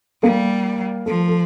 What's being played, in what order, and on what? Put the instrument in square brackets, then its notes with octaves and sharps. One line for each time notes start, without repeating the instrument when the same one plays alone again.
[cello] G3 [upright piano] A#3 A#4
[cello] F3 [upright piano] A3 A4
[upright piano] A4